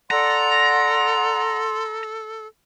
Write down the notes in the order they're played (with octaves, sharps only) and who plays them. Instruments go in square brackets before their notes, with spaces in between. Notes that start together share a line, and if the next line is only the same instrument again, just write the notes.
[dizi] A4 [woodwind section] D5 F#5 [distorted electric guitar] A#5 [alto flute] C6